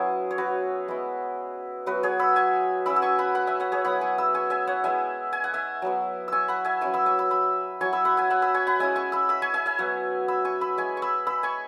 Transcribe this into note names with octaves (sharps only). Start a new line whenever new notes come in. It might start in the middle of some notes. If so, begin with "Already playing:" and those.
Already playing: F#3 B3 C#4 E4 G#4
C#5
F#4 B4
G#3 B3 E4
F#3 B3 E4 F#4 B4
G#4 C#5
B5 E6
G#5 C#6
F#3 C#4 E4 B5 E6
E6
G#5 C#6
F#5 B5
F#5 B5
E5 G#5
C#5 F#5
G#4 C#5
F#3 B3 E4 F#5 B5
G#5 C#6
B5 E6
G#5 C#6
E5 G#5
C#5 F#5
G#3 B3 E4 E5 G#5
G#5
F#5
E5 G#5
F#3 B3 E4
G#5 C#6 E6
F#5 B5
E5 G#5
F#3 C#4 E4 G#5 C#6
B5 E6
G#5 C#6
B5 E6
B5 E6
F#3 E4 G#5 C#6
B5 E6
F#5 B5
E5 G#5
F#5 B5
B5 E6
G#5 C#6
F#5 B5
G#3 C#4 E4 E5 G#5
G#5 C#6
B5 E6
B5 E6
G#5 C#6
E5 G#5
E5 G#5
F#3 B3 E4 C#5 F#5
B5 E6
G#5 C#6
B5 E6
G#3 E4 G#5 C#6
C#6
B5 E6
B5 E6
G#5 C#6